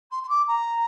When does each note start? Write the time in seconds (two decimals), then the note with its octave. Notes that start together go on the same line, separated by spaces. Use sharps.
0.11 C6
0.23 C6
0.29 D6
0.47 A#5